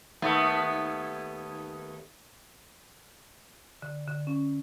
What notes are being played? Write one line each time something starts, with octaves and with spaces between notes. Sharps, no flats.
D#2 A3 B3
D3
D3
C#4